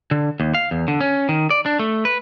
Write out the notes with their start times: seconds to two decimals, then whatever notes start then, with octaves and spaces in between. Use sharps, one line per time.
0.11 D3
0.40 D#2
0.55 F5
0.71 E2
0.88 D3
1.01 C#4
1.29 D#3
1.51 D5
1.66 D4
1.79 A3
2.05 B4